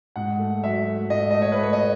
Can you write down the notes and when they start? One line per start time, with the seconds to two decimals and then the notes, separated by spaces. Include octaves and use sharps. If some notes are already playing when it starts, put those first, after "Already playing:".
0.16 G#2 F#5
0.39 A3
0.63 F#3 E5
0.87 A3
1.10 G#2 D#5
1.31 A3 D#5
1.42 C#5
1.52 B4
1.58 A3
1.63 C#5
1.73 D#5